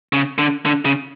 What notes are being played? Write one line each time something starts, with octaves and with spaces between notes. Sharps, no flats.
C#3
D3
D3
C#3